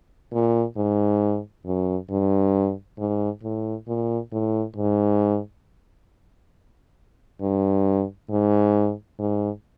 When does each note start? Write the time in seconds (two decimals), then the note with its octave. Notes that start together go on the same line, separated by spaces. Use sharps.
0.33 A#2
0.77 G#2
1.65 F#2
2.10 G2
2.98 G#2
3.44 A2
3.88 A#2
4.32 A2
4.76 G#2
7.41 G2
8.30 G#2
9.19 G#2